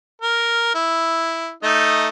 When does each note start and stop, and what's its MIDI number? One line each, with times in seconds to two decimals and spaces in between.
0.21 0.73 70
0.75 1.51 64
1.63 2.09 57
1.63 2.09 63
1.63 2.09 75